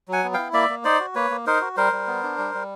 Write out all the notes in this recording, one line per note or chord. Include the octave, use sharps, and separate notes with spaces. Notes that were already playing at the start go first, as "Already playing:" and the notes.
F#3 F#5 G#5
B3
E4 F5 G5
A#3 D5 E5
A#3
D#4 C5 D5
F#4
A#3 B4 C#5
A#3
D#4 A#4 C5
F#4
G3 A#4 C5
G3
B3
D4
G3
G3